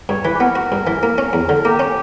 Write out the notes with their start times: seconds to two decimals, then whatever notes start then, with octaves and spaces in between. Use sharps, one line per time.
0.09 G2 C#5
0.24 E3 B4
0.34 G4
0.40 B3 A#4
0.55 F#4
0.72 G2
0.87 E3
1.03 A#3
1.18 C#4
1.33 E2
1.49 D3
1.65 A#3 G4
1.80 C#4